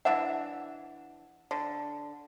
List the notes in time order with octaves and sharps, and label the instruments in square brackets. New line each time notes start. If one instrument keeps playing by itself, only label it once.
[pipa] E3 D4 E5 [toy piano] F#5
[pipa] D3